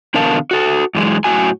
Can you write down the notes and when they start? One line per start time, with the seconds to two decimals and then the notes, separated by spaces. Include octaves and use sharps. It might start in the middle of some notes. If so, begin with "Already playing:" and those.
0.14 E2 B2 D3 A#4 F5 A5
0.51 F#4 A4
0.95 F#2 E3 G#3
1.24 F#2 A2 G3 F#4 G#5